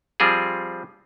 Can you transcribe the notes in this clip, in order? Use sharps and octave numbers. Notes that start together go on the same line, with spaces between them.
F3 G3 C4 F4 G#4